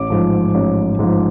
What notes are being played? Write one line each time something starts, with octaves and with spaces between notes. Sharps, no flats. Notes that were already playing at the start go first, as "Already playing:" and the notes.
Already playing: A1 D6
G#2 F3
A1
G#2 F3